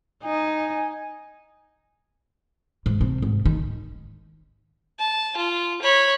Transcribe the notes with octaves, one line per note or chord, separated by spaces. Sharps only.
D#4 G#5
G#2
C3
G#2
D#3
A5
F4
C#5 B5